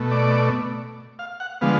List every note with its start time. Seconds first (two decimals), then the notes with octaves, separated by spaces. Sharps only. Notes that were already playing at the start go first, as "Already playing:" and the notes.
Already playing: B2 A3
0.11 D5
1.19 F5
1.40 F#5
1.61 D3 F3 G#3 B3 F5